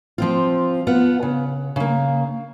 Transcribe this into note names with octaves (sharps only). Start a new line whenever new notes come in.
F3 C4 F4
B3 F4 F#5
C#3
C#3 A#3